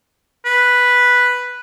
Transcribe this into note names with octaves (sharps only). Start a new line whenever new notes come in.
B4